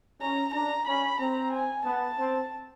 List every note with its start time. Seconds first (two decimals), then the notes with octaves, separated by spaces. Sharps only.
0.21 C#4 A#5
0.54 D4 A#5
0.87 C#4 B5
1.20 C4 A#5
1.53 G#5
1.85 B3 A5
2.18 C4